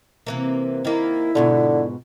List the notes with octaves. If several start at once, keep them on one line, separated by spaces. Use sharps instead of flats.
C3 E3 A#3
D#3 A#3 E4
G#2 B2 D3 F4